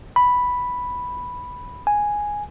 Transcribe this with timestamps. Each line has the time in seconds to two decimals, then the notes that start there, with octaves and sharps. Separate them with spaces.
0.16 B5
1.87 G#5